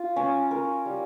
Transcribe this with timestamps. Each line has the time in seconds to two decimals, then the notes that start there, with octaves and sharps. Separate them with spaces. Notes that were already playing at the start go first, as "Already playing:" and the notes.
Already playing: F4
0.16 C#4
0.51 A#4
0.86 G3